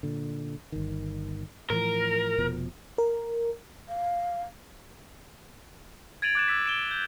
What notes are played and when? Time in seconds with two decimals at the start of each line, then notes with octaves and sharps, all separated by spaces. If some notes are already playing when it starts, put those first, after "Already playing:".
0.03 A#2 D3
0.72 G1 D#3
1.70 A2 E3 F3 A#4
2.38 F1 B2 F3
2.98 A#4
3.89 F5
6.22 G#6 A6 D7 D#7 F7 F#7
6.35 D6 F#6 A6 E7
6.48 E6 A6 B6
6.66 D7 E7 G7
6.91 G6